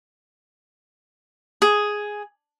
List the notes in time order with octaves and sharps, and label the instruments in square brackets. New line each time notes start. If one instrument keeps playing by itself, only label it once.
[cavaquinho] G#4